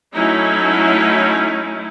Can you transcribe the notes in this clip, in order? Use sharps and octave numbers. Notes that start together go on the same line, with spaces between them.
F#3 A3 C#4 D#4 E4